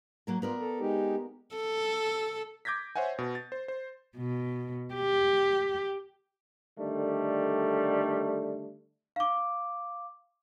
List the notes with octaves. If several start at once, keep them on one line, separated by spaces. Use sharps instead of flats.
F#3 A#3 A#4
B3 F4 A#4 D5
A4
G#3 D#4 G4
A4
D6 G6 G#6 A#6 B6
C5 C#5 E5 F#5 G#5
B2
A6
C5
C5
B2
G4
D3 D#3 G3 A3
F5 D6